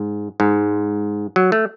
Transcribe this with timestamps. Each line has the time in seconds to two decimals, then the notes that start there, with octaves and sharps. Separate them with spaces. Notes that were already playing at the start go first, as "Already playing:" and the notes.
Already playing: G#2
0.40 G#2
1.36 F#3
1.52 A3